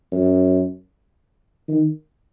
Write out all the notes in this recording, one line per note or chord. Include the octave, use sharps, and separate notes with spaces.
F#2
D#3